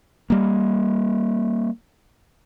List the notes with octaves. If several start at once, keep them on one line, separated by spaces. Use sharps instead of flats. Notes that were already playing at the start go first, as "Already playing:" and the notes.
G3 A#3